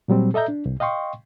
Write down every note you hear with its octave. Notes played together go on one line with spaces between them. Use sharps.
A#2 F#3 G3 C4
A4 D#5 E5 A#5 G6
D4
C2
D#5 F5 G5 C6 C#6